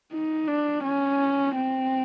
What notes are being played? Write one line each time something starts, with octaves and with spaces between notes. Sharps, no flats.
D#4
D4
C#4
C4